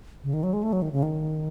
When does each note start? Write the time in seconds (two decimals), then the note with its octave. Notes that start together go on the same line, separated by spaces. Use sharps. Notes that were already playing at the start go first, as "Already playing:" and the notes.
0.24 C#3
0.34 D#3
0.43 F#3
0.53 G#3
0.63 A3
0.73 F#3
0.82 D#3
0.92 C#3
1.03 D#3